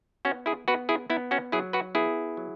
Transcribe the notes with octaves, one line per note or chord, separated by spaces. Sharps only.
B3 C#4 F#4
E4 G#4
B3 F#4 B4
E4 G#4
B3 E4
C#4 F#4
F#3 E4 G#4
F#4 B4
B3 E4 G#4
F#3